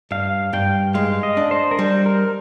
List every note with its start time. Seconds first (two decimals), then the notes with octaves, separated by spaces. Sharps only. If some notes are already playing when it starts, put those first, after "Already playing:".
0.11 G2 F5
0.53 G2 G5
0.94 G#3 F5
1.23 D#5
1.37 D4
1.51 C5
1.71 A#4
1.78 G3 C5
2.06 A#4